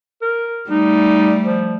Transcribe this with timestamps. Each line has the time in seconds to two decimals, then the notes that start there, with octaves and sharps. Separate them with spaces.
0.22 A#4
0.70 G3 A3 D#4
1.44 F3